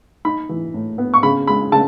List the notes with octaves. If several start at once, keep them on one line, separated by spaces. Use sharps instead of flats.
D#4 B5
E3
A2
B3
C#6
C#3 B5
G#3 B5
C#3 A5